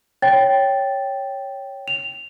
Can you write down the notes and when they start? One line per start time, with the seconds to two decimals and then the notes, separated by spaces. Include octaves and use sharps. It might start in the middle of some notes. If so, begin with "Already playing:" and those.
0.22 C#5 G5 A6
1.88 F7